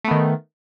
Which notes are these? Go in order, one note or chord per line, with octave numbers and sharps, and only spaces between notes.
D#3 A3 B3